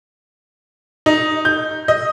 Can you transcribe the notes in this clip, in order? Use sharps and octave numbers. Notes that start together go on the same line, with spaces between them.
D#4
G6
D#5